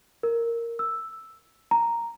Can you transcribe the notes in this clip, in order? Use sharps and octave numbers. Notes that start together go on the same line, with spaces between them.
A#4
E6
A#5